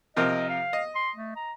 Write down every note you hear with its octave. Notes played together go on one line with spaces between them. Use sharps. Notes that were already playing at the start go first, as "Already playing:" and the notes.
C3 F3 A#4 D#5
F5
D#5
C6
A3
A#5